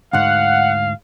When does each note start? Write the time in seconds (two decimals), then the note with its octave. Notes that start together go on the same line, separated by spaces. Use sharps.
0.13 D2 G#2 F5 F#5